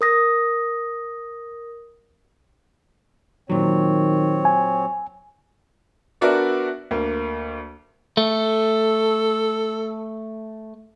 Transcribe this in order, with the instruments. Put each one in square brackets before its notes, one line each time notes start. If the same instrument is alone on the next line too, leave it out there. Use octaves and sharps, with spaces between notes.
[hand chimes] A#4 D#6 A#6
[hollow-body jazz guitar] A#2 F#3 [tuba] D#3 [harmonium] C4 C#5
[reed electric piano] G#5
[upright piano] B3 D4 F#4 A#4 D5 E5
D2 A#3
[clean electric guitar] A3 [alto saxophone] A4